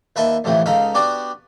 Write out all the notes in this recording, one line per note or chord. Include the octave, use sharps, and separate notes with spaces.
D#2 B4 E5 A5 C6
F2 A2 C3 E3 C4
C#2 D#4 A4 F5 B5
B3 D4 F#4 G4 D5